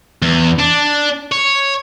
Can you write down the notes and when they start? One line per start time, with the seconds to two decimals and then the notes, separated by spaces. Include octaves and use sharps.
0.22 E2
0.59 D4
1.32 C#5